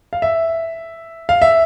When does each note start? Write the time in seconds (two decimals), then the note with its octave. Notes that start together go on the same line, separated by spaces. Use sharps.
0.13 F5
0.22 E5
1.29 F5
1.42 E5